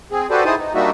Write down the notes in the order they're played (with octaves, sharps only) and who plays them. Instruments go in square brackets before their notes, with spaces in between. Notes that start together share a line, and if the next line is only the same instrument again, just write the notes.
[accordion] C4 G#4
F#4 G4 A4 B4 C5 D5
D#4 E4 G#4 C5 A5 D#6
D#4
G3 A#3 D4 D#4 F#4 E5